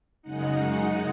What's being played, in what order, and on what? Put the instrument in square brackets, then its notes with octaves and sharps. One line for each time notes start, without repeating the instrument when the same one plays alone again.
[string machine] F#2 C#3 G#3 D#4 F#5